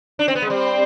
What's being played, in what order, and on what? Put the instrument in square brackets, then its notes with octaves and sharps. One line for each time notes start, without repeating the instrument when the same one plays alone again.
[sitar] D4
C4
B3
G#3
[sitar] G3 [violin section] C4 C5